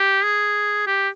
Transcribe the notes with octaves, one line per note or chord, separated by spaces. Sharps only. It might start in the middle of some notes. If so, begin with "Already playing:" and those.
Already playing: G4
G#4
G4